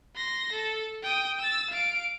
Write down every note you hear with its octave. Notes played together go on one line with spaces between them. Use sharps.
C6 A#6
A4
G5 D#6
E6 A6
F5 D7